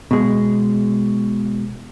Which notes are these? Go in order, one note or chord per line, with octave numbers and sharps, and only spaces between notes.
B2 G#3